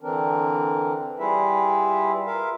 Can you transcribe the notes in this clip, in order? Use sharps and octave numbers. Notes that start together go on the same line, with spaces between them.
D3 E3 C4 D4 A#4
G3 E4 F4 G#4 B4 E5
F4 A#4 E5 F5